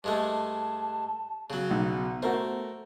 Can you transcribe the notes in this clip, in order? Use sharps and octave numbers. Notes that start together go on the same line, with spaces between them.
G2 G#3 A3 A5
C#3 F#3 B3
B1
A3 F#4 A#4 C5